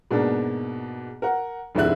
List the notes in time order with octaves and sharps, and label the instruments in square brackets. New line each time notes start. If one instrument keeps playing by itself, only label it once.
[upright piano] G#2 B2 A#3 D4
A#4 F#5
F1 D2 G#2 E4 F#6